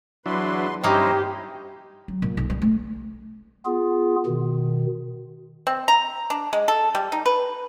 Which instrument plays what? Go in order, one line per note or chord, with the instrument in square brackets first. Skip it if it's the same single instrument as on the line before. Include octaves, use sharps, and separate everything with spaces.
[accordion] E2 B4 C6 [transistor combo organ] F#3 D4 E4
[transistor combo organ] G2 C#4 [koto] A#3 D#4 [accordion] E4 C5 D#5 [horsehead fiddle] G4
[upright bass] F#3
A#2
B1
G3
A3
[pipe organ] B3 F4 G#4
B2 D#3
[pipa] C4
A#5
D4
G#3
A4
G3
D#4
B4